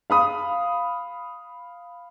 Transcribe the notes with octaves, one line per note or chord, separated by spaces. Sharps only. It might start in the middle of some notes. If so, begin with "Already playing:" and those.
F5 B5 D#6